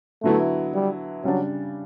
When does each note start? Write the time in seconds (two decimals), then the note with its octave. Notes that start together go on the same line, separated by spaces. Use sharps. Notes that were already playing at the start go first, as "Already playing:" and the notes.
0.23 D3 F#3 A3 B3 E4
0.74 G3
1.24 C#3 F#3 G3 D4